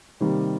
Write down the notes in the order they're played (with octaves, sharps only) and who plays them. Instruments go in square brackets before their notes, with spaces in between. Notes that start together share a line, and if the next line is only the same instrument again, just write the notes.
[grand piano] C3 D#3 G3 A#3